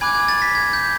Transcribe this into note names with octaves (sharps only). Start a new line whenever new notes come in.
G#5 B5 D6 F#6 G#6
G#6
A6
B6
G#6
G6